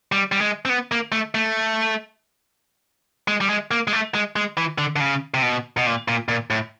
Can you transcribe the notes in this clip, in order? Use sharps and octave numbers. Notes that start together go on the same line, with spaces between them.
G3
G3
G#3
C4
B3
A#3
A3
A3
G#3
G3
G#3
A#3
G#3
A3
G#3
G#3
E3
D3
D3
C#3
C3
B2
B2
A#2
A#2
A#2
A2